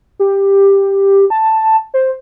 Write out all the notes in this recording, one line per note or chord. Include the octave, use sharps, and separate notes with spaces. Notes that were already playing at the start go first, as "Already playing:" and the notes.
G4
A5
C5